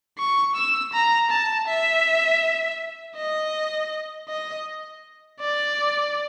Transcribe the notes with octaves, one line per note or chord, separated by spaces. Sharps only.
C#6
E6
A#5
A5
E5
D#5
D#5
D5